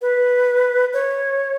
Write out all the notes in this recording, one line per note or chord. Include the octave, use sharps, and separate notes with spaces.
B4
C#5